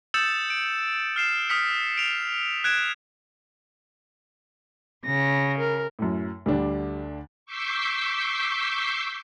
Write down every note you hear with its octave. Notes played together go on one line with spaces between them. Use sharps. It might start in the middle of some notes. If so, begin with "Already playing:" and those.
D#6 E6 G6 A6 C#7 E7
D7
F6 C7 E7
D#6 F6 B6 C#7
D7 F7
F#6 G#6 D7 E7
C#3 A#6
A#4
F#2 A2
D2 D3 G3 D4
C#6 D6 E6 G6 B6 C7